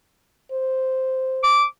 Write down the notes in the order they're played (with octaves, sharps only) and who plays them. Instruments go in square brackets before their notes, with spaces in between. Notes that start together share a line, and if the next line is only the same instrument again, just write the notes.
[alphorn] C5
[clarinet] D6